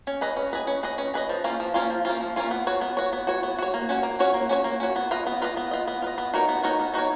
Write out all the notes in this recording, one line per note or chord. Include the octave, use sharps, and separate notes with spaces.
C#4
G#4 B4 D#5
C#4
G#4 B4 D#5
C#4
G#4 B4 D#5
C#4
G#4 B4 D#5
F3
A#3 C#4 F4
F3
A#3 C#4 F4
F3
A#3 C#4 F4
F3
A#3 C#4 F4
B3
F#4 C#5
B3
F#4 C#5
B3
F#4 C#5
B3
F#4 C#5
A#3
C#4 F#4 C#5
A#3
C#4 F#4 C#5
A#3
C#4 F#4 C#5
A#3
C#4 F#4 C#5
B3
F4 B4 D#5
B3
F4 B4 D#5
B3
F4 B4 D#5
B3
F4 B4 D#5
B3
D#4 F#4 A#4 C#5
B3
D#4 F#4 A#4 C#5
B3
D#4 F#4 A#4 C#5